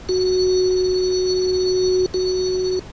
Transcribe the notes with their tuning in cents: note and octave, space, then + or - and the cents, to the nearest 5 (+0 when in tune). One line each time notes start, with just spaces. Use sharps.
F#4 -5
F#4 +0